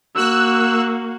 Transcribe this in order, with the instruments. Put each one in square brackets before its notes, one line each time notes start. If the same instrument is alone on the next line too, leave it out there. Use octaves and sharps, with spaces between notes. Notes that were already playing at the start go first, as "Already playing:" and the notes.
[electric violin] A#3 F#4 [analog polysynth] E6 F#6